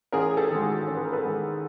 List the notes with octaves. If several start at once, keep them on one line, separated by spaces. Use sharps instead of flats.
A1 G#4 A#4
G#4
G4 A4
G#2 D#3
F#4 G#4
A1
B4
A#4
A4 B4
G#2 D#3